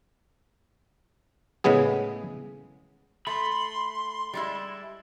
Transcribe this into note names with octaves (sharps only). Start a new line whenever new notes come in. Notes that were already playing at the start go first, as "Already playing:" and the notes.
A2 C#3 G#3 B3 G#4
A3 B5 C6
G3 G#3 E4